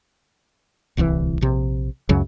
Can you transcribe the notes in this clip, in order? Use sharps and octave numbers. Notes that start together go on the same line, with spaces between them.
D1 C2 D3 E3
A#1 C3
C#2 F#2 C#3 F#3